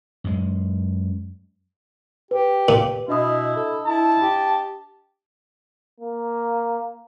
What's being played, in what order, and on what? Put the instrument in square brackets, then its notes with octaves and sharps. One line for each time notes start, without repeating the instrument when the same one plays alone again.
[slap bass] F#2 G#3
[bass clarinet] G4 [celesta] B4
[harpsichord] A#2
[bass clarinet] B2 [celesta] D4 D#5 D#6 [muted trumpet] E4
[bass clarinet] A4
[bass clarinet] E4 [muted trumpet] A5
[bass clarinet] G4
[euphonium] A#3